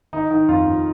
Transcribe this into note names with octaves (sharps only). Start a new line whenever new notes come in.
D#3 D#4
D#3
F2 F4
F2